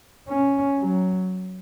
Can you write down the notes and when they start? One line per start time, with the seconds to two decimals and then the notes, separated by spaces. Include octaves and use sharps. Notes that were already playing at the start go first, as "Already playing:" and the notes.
0.28 C#4
0.80 F#3